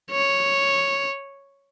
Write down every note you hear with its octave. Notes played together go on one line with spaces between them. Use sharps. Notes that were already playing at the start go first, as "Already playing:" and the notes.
C#5